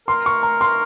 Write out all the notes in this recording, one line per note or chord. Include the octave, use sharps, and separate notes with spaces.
A#4 C6
C#6
A#5
C6